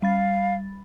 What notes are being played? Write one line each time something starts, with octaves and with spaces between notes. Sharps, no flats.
G3 F5 B5 A6